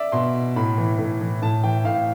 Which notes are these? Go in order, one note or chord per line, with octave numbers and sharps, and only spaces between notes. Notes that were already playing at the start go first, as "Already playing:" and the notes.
Already playing: D5 E5
B2 C6
A2 B5
E3
A2
E3
A2 A5
E3 G5
A2 F5